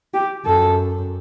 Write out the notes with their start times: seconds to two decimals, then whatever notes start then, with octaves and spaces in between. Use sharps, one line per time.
0.14 G4
0.46 F#2 A4